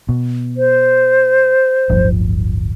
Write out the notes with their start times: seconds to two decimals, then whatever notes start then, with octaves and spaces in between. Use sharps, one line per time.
0.09 B2
0.57 C5
1.89 D1 G1 F3